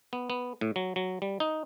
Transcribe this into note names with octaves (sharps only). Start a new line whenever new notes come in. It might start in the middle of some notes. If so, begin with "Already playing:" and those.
B3
B3
A2
F#3
F#3
G3
D#4